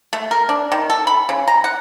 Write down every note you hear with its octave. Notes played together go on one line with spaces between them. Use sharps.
A3
A#4
D4
D#3
A4
B5
C#3
A#5
F#5